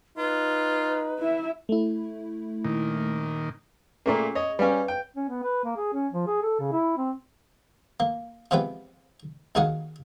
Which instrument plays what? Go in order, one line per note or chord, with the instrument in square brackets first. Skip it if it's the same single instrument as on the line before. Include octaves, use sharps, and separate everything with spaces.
[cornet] D#4 [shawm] F4 [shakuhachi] B4
[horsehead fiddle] E4 E5
[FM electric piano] A3 E4
[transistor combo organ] A#2 D#3
[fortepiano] A#2 A3 A#3 [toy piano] C#4 G#4
[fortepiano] C#5 D#5
[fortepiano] G3 C#4 [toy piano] B4 F5 G#5
[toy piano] C#5
[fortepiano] G5
[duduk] C#4
B3
B4
A#3
G#4
C#4
F3
G#4
A4
C#3
E4
C4
[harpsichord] A#3
C3 F3 G#3 B3 B4 G5
D#2 D#4 F#4 G#4 F5 F#5